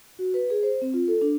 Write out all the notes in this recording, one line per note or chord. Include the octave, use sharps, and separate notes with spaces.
F#4
B4
G#4
C5
C4
F4
A4
D4